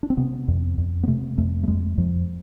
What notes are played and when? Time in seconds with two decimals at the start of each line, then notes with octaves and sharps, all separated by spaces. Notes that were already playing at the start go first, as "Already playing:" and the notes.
0.03 D4
0.10 C4
0.17 C3 B3
0.48 F2
0.78 F2
1.03 B3
1.07 C3 A3
1.38 F2 A3
1.63 A3
1.68 F2 G#3
1.98 F2 F3